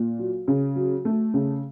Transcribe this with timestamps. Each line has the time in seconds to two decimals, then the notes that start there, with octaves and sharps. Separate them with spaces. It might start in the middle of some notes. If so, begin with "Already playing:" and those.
Already playing: A#2
0.19 F#3
0.48 C#3
0.76 F#3
1.05 A3
1.34 C#3